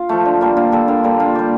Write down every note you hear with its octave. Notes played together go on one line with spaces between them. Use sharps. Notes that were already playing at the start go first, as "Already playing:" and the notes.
Already playing: F4
F3 A3
D3
G3 A#3
D3 F4
G3 A#3 A4
D3 A#4
G3 A#3 A4
D3 F4
G3 A#3 G4